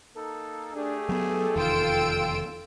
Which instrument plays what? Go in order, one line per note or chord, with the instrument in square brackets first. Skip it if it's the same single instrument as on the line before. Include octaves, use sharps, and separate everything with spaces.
[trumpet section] A#3 D#4 A4
[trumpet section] A3 G4 G#4 [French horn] D4
[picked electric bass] F#3 B3 [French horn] A4
[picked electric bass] F1 E2 D#3 [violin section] F4 E6 D7 [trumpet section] G5